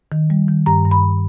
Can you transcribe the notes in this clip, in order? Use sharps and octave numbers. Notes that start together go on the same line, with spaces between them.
D#3
G3
D#3
G2 A#5
G2
B5